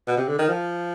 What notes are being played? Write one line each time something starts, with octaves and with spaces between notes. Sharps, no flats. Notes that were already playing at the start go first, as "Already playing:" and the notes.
B2
C3
D3
D#3
F3